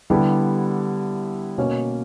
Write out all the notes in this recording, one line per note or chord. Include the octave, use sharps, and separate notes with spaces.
D3 G3 B3 E4 G4
B2 A#3 C#4